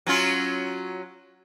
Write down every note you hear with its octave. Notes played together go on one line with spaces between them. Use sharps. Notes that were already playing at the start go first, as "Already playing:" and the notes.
F#3 C#4 F4